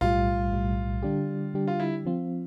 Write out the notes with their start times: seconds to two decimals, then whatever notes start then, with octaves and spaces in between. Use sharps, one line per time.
0.01 B1 A2 G3 F4
0.52 B1 A2 G3
1.03 D3 G3 D4 G4
1.54 D3 G3 D4 G4
1.68 F4
1.80 E4
2.05 F3 C4 F4